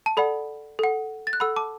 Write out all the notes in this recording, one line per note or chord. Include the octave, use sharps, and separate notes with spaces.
A5
A4 D5 F#5 B5
A4 F#5
A6
F#6
A4 F#5 B5 E6
A5 D6